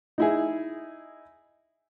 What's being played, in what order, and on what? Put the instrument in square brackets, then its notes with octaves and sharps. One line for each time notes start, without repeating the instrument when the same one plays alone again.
[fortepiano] D#4 E4 G#4